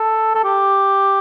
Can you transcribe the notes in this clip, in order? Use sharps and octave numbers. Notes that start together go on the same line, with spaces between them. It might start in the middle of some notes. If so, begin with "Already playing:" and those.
Already playing: A4
A4
G4